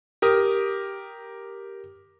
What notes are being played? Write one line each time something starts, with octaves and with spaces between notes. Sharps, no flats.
G4 A#4 D#6